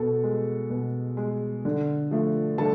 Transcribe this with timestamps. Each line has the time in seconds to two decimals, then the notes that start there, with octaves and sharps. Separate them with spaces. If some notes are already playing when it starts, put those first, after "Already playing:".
Already playing: B2 A4
0.24 G#3
0.70 B2
1.17 G#3
1.65 D3
2.11 F3 A3
2.58 D3 A4 A5